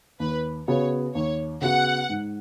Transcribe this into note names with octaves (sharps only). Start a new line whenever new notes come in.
D#2 B4
C#3 B3 F#4 C#5
D#2 C#5
C#3 B3 F#4 F#5
G#2